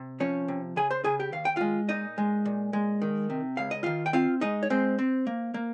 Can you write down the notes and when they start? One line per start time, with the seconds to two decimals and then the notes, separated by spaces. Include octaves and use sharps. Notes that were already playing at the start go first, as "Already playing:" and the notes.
Already playing: C3
0.20 F3 C#4 C#5
0.48 C3
0.76 C#3 G#4 G#5
0.91 C5 C6
1.04 C#3 G#4 G#5
1.20 G4 G5
1.33 D#2 F5
1.45 G5
1.56 G#3 F4 F5
1.89 A#2 D#4 D#5
2.18 G#3
2.45 A#2
2.73 G#3
3.02 D#3
3.30 C3
3.57 C#2 F5
3.71 D#5
3.83 D#3 F4 F5
4.06 G5
4.13 C4 F4 F5
4.41 G#3 D#4 D#5
4.63 C#5
4.70 G#3 C4 C5
4.99 C4
5.27 A#3
5.54 A#3